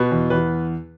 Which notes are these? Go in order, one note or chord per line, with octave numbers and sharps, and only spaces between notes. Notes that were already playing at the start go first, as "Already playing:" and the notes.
Already playing: B2 B4
E2
E2 B4